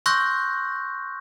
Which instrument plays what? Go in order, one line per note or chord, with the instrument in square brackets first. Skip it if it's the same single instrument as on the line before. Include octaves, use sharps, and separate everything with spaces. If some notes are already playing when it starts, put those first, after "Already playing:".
[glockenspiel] C6 C#6 E6 F#6 G6 A#6